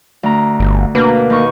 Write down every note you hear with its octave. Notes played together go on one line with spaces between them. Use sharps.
D2 A#5
G1
B2 A#3 D4 B4
D#2 D#4 C#6